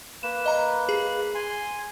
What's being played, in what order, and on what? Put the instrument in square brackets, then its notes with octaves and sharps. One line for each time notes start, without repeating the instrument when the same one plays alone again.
[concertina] A#3 B4 [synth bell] E7
[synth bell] D#5 A#5
G#4
[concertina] G#5 C6